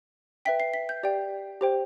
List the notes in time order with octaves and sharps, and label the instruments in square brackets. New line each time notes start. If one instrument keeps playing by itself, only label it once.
[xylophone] B4 E5 G5 B6
C7
B6
G6
G4 D5 G5
G4 C5 G5